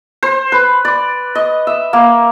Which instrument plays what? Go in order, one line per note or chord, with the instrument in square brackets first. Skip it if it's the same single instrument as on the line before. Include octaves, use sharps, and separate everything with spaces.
[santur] C5
B4
D5
D#5
E5
A#3